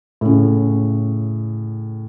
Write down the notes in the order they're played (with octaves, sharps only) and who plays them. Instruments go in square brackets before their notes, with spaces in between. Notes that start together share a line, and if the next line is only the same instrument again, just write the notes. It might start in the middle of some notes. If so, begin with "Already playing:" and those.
[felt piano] A2 C#3